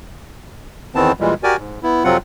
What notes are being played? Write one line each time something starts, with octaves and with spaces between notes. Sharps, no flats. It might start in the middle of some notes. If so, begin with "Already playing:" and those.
E2 D#3 E3 B3 C4 A5
A#2 E3 G3 G#3
F#4 G4 A#4 D5 G#5
G#2
B3 E4
F2 C3 F#3 C4 F4 F#5